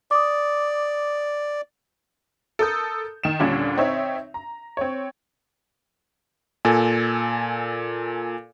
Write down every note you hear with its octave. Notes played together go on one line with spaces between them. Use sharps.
D5 D6 D#6
A4 A#4 D#6 G6
D#3 E7
D#2 A#2 D3 G3 C#4 D4
C4 D#4 C#5 E5
A#5
C4 C#5
A#2 A4 G#5